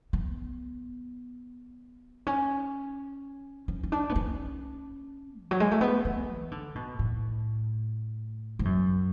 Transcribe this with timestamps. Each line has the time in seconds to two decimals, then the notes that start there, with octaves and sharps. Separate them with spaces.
0.13 B3
2.27 C#4
3.68 C#4
3.83 C#4
3.92 D4
4.09 B3
4.16 C#4
5.41 E3
5.51 F#3
5.60 G#3
5.71 A3
5.81 B3
6.05 C#4
6.29 E3
6.51 D3
6.75 B2
6.99 A2
8.59 G#2
8.65 F#2